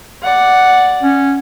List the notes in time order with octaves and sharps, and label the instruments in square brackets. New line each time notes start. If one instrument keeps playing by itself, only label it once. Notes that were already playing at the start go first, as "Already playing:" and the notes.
[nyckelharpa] D5 F#5
[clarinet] C#4